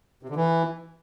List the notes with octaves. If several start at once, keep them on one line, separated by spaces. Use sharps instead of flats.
C3
D3
E3